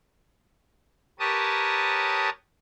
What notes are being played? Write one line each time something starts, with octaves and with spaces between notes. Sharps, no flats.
G4 A#4 B4 C#5 A5 D#6